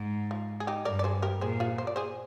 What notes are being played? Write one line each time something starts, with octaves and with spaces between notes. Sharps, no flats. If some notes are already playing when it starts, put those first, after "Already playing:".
Already playing: G#2
F3
G#4
D#4 G4
G2 A#4 D5
D5
G#4 C5
G4 A#4
A#2 G#4 C5
F4 G#4
C5
D5
G#4 C5